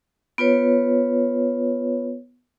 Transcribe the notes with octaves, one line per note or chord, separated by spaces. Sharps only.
B3 F4 B4 C#5